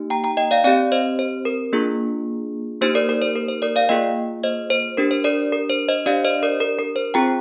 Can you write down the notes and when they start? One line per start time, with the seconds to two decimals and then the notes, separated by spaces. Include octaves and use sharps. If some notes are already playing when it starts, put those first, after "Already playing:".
Already playing: A#3 D#4 G4
0.10 G5 A#5
0.24 G5 A#5
0.37 D#5 G5
0.51 D5 F5
0.64 C4 G4 D5 F5
0.92 C5 D#5
1.19 C5
1.45 A#4
1.72 A#3 D4 F4 G#4
2.81 A#3 D#4 G4 C5
2.95 A#4 D5
3.09 A#4
3.22 C5
3.36 A#4
3.48 C5
3.62 A#4 D5
3.76 D5 F5
3.89 A#3 F4 G#4 D#5 G5
4.44 C5 D#5
4.70 C5
4.97 D4 G4 A#4
5.11 C5
5.24 A#4 D5
5.52 A#4
5.69 C5
5.88 C5 D#5
6.06 D4 G4 D5 F5
6.24 C5 D#5
6.43 A#4 D5
6.60 A#4
6.79 A#4
6.96 C5
7.14 C4 F4 G#4 G5 A#5